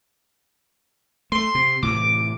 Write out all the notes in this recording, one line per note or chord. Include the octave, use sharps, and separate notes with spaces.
A3 C6
C3
A2 C3 E3 D6